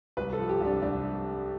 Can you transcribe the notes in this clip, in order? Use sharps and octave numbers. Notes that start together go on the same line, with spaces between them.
C2 B4
A4
F3
G4
C2 D4
C2 D4